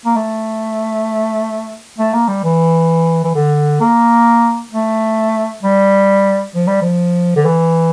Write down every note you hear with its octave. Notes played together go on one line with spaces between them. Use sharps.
A#3
A3
A3
A#3
G3
E3
E3
D3
A#3
A3
G3
F3
G3
F3
D3
E3